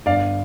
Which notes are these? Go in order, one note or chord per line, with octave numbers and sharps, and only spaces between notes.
G1 D5 F5